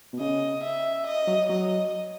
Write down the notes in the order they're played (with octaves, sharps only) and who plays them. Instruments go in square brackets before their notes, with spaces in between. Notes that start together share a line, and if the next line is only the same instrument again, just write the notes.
[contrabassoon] B2
[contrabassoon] C#3 [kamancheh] D#5
[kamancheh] E5
D#5
[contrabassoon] F#3
[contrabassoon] F#3 [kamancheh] D#5